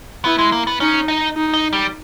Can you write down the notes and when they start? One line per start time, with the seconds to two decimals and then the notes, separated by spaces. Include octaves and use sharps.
0.25 B3 E4
0.39 G#3
0.52 A#3
0.67 B3
0.80 C#4 D#4
1.08 D#4
1.36 D#4
1.54 D#4
1.73 G3